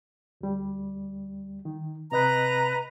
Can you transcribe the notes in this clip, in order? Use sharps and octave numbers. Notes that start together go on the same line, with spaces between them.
D2 G3
D#3
C3 B4 D#5 A#5 F#6